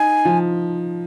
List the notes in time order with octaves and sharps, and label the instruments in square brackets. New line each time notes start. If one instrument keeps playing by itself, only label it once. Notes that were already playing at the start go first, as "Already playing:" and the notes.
Already playing: [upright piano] D#4 [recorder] G#5
[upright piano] F3